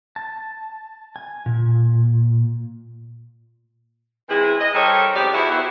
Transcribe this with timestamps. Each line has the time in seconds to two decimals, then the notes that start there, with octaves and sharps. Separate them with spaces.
0.16 A5
1.16 G#5
1.46 A#2
4.29 E3 G#3 C4 E4 G#4
4.60 D#5
4.74 G3 A4 A#4 C5 C#5
5.14 F2 G#2 B3 G4 D5
5.33 E2 E4 F#4
5.50 B3 E4 F#4 G4 C5